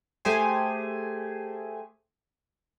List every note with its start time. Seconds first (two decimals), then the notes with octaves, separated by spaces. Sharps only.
0.25 A3 G4 G#4 C5 G#5